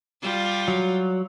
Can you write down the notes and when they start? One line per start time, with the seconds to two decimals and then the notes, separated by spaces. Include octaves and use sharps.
0.22 G3 F4
0.68 F#3